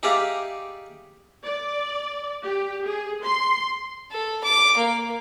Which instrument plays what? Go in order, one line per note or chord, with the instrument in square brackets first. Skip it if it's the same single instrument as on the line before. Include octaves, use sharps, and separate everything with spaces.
[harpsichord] D#4 G4 G#4 D5 E5 F5
[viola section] D5
G4
G#4
C6
[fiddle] A4
D6
A#3